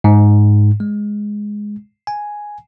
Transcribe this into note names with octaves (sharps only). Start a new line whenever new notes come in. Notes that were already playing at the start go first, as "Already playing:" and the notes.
G#2
G#3
G#5